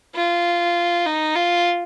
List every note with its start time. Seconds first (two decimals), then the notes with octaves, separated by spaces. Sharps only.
0.15 F4
1.06 D#4
1.36 F4